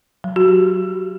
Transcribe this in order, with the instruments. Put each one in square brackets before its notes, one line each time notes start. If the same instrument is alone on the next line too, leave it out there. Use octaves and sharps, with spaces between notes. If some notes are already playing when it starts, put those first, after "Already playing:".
[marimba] F#3
F#4
G4